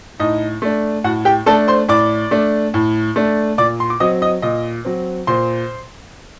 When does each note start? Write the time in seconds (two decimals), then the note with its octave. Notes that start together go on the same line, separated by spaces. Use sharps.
0.19 A2 D#4 D#5
0.62 A3 D4
1.04 A2 F#4 F#5
1.25 G4 G5
1.46 A3 D4 A4 A5
1.68 C5 C6
1.88 A2 D5 D6
2.31 A3 D4
2.74 A2
3.16 A3 D4
3.58 A#2 D5 D6
3.80 C6
3.90 D6
4.00 F#3 C4 D#5 D#6
4.22 D#5 D#6
4.42 A#2 D#5 D#6
4.85 F#3 C4
5.27 A#2 C5 C6